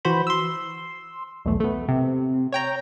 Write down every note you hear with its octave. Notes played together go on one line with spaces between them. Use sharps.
E3 F#4 C5 B5
C6 E6
B1 E2 A3
A3 B3
C3
C#5 G5 A#5